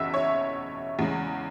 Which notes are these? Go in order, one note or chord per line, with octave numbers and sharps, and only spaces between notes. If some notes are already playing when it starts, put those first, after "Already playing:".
Already playing: F#1 E2 B2 E5
C#5
E2 C#3 G#3